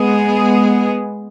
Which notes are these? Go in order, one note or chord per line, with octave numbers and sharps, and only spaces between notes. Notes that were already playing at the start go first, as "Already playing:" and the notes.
Already playing: G#3 B3 G#4